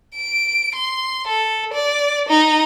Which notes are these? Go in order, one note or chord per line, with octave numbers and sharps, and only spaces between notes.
D7
C6
A4
D5
D#4